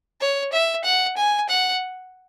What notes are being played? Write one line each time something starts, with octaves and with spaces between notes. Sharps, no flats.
C#5
E5
F#5
G#5
F#5